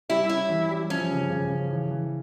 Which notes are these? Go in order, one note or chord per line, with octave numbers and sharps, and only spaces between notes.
G3 E4
C#4 E4
E3
G3
F3 C#4
C#3
C#3
C#3
E3
E3